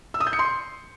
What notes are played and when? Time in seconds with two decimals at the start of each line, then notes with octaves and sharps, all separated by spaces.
0.14 E6
0.20 D#6
0.27 G6
0.33 C#7
0.39 C6